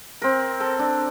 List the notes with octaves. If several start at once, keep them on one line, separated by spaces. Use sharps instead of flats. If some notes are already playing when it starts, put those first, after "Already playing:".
C4 A#4
A4
D4